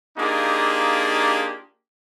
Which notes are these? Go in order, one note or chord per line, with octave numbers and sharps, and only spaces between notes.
A#3 D4 D#4 F4 G4 G#4